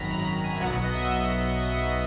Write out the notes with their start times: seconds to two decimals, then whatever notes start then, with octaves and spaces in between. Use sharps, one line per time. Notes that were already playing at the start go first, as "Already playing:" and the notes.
Already playing: G#1 F#2 D#3 F#3 A#5 B5
0.11 A#5
0.20 B5
0.28 A#5
0.44 G#5
0.56 E5
0.61 B1 B2 F#3 B3 F#5
0.84 D#5
0.95 E5